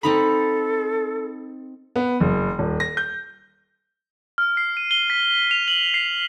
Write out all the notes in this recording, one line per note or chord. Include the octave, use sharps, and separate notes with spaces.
C4 D#4 A4 B5
B3
F#1
D#1
A#6
G6
F6
C7
D#7
G7
B6
F7
F#7
C7